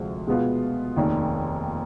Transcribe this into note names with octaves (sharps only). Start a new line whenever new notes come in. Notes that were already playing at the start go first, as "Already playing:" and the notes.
Already playing: D2 C3 F3 G#3
B2 G#3 B3 F4
F1 D#2 D#3